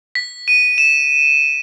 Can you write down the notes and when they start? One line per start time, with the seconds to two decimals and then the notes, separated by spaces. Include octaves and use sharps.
0.15 B6
0.48 D#7
0.78 E7